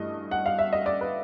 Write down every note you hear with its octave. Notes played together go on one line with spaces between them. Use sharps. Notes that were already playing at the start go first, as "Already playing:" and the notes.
Already playing: G2 E3 A3 D#5
F#5
F5
E5
D#5
D5
B4